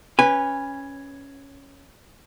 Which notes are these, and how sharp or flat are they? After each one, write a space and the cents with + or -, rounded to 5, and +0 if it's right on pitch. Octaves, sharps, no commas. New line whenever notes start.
C#4 +0 B4 +0 G#5 -25